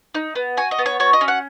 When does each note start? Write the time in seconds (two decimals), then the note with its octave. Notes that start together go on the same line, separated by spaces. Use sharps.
0.15 D#4
0.35 B3
0.57 F#4 G#5
0.71 D#5
0.79 B3
0.86 C#5
1.00 F#4 C#5
1.13 D#5
1.21 C#4
1.28 F#5